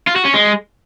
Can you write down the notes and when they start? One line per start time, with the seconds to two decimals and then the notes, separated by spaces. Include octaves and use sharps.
0.07 F4
0.16 F#4
0.25 C#4
0.34 G#3